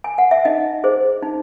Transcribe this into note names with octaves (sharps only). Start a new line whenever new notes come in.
G#5
F#5
E5
D#4 D#5
G#4 C5
D#4